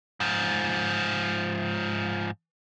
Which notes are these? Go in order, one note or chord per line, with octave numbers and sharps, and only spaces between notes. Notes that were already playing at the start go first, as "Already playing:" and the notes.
G#2 F3